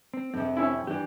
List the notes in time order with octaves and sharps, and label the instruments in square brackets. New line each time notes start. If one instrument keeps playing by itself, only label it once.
[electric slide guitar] C4
[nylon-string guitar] F2 C3 [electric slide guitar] C4
[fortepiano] C#4 E4
[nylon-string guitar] E3 [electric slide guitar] D4 G4